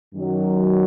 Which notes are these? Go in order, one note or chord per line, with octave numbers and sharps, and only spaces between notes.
F#2 D#3 F#3